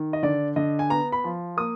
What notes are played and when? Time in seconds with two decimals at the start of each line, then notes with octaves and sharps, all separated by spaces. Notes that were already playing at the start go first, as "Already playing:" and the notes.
Already playing: D#3
0.13 D#5
0.23 D3 D5
0.56 D3 D#5
0.79 G#5
0.90 B3 A#5
1.12 B5
1.24 F3
1.57 A#3 D#6